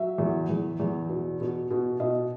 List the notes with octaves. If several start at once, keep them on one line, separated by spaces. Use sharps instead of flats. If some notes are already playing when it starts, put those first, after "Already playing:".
Already playing: F#3 E5
E2
E2
E2
B2
B2
B2
B2 D#5